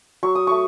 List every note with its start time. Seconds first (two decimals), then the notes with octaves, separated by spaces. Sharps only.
0.23 F#3 C#6
0.35 D#6
0.47 A3 C#6